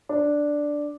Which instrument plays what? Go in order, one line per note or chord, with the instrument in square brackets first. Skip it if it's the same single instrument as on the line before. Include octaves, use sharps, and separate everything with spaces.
[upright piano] D4